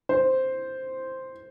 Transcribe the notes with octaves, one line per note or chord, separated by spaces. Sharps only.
C5